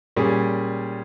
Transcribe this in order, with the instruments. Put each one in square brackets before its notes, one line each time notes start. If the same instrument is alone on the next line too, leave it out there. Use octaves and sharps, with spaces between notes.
[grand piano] A#2 G3 C#4 G#4